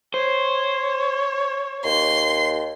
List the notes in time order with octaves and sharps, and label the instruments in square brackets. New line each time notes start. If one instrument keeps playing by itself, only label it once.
[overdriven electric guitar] C5 [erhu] C#5
[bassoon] D#2 [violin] C6